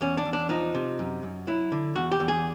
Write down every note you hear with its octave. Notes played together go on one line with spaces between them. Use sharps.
E2 C#4
D4
E2
D4
F3 D#4
C3
F#2
F#2
F#3 E4
D3
E2 F#4
G4
E2
G#4